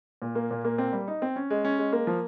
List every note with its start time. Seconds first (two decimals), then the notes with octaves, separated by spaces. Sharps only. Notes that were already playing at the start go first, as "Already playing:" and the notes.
0.22 A#2
0.35 A#3
0.51 A#2
0.65 A#3
0.78 C4
0.93 G3
1.08 D#4
1.22 C4
1.36 C#4
1.50 G#3
1.65 C#4
1.79 G#3
1.93 A#3
2.07 F3